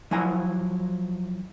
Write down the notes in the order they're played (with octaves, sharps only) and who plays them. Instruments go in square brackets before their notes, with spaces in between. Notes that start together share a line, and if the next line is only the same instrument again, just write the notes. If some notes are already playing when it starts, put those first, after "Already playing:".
[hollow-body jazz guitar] F3 F#3 E4 F#5 G#5 A#5